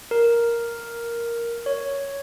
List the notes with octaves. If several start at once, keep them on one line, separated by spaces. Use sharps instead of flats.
A#4
C#5